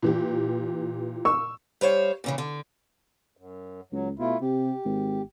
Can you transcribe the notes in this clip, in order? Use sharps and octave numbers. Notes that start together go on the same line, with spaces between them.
A#2 E3 G4
C#6 E6
G3 C5 C#5 F5
A#2 C#3 E3
D3
F#2
C#2 F#3
B2 A3 E4 F4
C3 G4
G#1